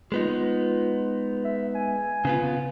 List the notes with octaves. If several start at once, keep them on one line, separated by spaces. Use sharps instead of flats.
G#3 B3 D#4 F4
E5
G#5
C#3 B3 F4